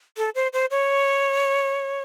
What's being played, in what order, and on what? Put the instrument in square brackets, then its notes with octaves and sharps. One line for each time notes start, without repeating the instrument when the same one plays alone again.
[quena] A4
C5
C5
C#5